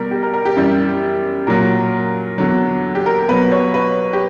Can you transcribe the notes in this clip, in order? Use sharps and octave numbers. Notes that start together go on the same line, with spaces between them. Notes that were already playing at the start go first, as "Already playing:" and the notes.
Already playing: B2 G3 A#4
G4
A#4
A#4
G4
F#2 E3 G3
A#2 F#3 A#4
E2 D3 F#3
G4
A#4
B2 F#3 B4
C#5
B4
G4